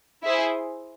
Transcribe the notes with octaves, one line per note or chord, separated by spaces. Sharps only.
E4 G#4 C5